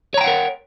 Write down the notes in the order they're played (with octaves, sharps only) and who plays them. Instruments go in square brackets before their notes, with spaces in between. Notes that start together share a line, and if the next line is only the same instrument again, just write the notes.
[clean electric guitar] C#5
A#5
G5
F#5
A#4